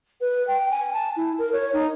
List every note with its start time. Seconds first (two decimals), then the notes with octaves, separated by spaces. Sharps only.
0.21 B4
0.47 G5
0.71 G#5
0.93 A5
1.16 E4
1.39 A#4
1.53 C#5
1.73 D#4